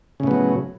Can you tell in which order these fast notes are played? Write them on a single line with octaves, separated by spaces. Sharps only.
C#3 A2 B3 F#3